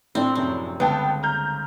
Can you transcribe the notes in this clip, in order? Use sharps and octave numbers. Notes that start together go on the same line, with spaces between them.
A2 C4 D4
F1 F#2 C4 C#4
G1 C#2 B3 D4 G5 A5
A#5 F6 G6